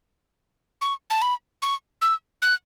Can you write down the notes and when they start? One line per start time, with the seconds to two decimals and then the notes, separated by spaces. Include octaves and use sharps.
0.81 C#6
1.10 A5
1.22 B5
1.62 C#6
2.02 E6
2.42 F#6